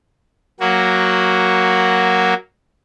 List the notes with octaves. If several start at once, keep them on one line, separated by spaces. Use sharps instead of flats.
F#3 A#3 F#4